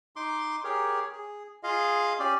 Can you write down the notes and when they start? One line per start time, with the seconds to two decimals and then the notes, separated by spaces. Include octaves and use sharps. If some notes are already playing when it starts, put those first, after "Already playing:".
0.16 D#4 C6 D6
0.64 G4 G#4 A#4 C#5
1.13 G#4
1.63 F4 G#4 D#5 F5
2.19 C#4 G4 D5